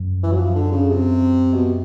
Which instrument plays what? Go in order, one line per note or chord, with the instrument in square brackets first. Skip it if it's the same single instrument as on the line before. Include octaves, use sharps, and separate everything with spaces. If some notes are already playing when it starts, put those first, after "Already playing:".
Already playing: [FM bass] F#2
[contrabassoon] E3
F#3
F3
D3
C#3
C3
B2